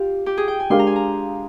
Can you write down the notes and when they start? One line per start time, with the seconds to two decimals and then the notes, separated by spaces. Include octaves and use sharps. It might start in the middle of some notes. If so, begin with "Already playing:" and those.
Already playing: F4 G4
0.26 G4
0.37 G#4
0.48 G5
0.60 G#5
0.70 G#3 D4 G4 A#4 F5 C6
0.79 A#5
0.87 G#5
0.96 A#5